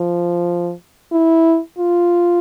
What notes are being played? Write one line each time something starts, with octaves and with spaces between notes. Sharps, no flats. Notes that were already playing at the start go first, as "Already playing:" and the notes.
Already playing: F3
E4
F4